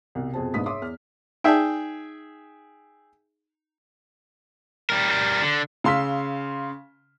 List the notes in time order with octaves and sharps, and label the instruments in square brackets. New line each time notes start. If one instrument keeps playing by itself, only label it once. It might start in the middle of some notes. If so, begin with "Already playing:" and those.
[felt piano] C2 B2
F2 B2 G#4 C5 A5
A#1 G#2 B3 D#6 B6
G#4 C#5 E5 C6 D6 D#6
E2 F6
[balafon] D#4 D5 A5 [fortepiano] G#4 E5 G5
[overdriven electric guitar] G3 A#4
G3 A#4
D3
[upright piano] C#3 F5 C6 E6 B6